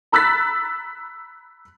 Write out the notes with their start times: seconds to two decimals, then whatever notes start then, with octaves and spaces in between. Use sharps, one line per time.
0.12 A#5 B5 E6 F#6 A6 B6